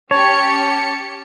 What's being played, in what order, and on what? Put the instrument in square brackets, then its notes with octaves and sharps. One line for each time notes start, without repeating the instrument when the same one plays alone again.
[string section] C#4 G4 C#7 [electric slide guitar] C#5 [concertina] A5